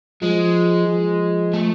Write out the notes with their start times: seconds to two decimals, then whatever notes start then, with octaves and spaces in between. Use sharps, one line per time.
0.22 F3 G#3
0.88 F3
1.54 A3